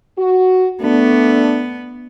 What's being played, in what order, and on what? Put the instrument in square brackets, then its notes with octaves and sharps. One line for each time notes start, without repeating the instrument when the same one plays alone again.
[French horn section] F#4
[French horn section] A3 D4 [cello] B3